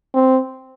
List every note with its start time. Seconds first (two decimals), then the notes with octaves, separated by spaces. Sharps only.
0.15 C4